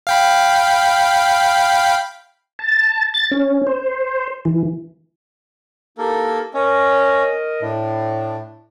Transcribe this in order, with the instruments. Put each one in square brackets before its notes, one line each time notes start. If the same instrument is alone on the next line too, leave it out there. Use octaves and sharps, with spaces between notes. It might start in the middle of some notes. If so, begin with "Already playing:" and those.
[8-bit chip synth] F5 G5 B5
[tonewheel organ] A5
A6
C#4
C5
E3
[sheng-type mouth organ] A#3 A4 A#4 [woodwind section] D#4 E4 G4
[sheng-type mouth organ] C#4 C#5 [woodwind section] A#4 D#5
[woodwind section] A2 [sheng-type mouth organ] A3 D4